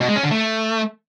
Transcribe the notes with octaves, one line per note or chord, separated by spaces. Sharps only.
B2
G#3
C#4
D3
A3